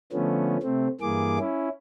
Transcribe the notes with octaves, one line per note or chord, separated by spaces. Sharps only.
D3 F3 A3 B3 C#4
C3 A3 C4
G2 E3 A#3 G#4 D6
C#4 E4